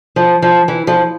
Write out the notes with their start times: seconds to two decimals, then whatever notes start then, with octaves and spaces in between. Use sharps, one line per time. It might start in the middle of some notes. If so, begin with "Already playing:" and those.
0.16 F3
0.42 F3
0.68 E3
0.87 F3